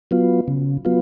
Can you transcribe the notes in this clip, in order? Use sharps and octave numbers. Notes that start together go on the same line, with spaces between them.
F#3 B3 F4
C#3
F#3 B3 F4